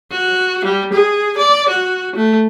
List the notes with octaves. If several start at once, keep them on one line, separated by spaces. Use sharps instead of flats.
F#4
G3
G#4
D5
F#4
A3